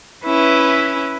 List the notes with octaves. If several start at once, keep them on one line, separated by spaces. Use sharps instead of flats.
C#4 E4 B4